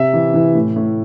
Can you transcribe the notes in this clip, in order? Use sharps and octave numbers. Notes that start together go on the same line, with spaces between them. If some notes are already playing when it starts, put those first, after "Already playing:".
Already playing: C3 E5
E3
E3
A2
A2